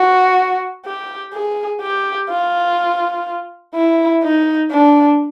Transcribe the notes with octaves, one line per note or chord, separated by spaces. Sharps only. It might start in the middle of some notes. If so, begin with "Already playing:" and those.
Already playing: F#4
G4
G#4
G4
F4
E4
D#4
D4